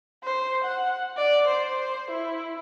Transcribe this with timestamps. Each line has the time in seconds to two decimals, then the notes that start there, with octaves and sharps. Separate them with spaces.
0.23 C5
0.63 F#5
1.17 D5
1.47 C5
1.81 C5
2.11 E4